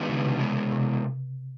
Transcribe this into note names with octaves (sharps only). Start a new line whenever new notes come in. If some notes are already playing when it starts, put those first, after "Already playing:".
Already playing: D#3 G#3 B3 D4 F#4
C#3
C3
B2 G#3 B3
C3